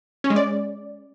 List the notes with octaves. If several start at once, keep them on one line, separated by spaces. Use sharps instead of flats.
C#4
G#3
D5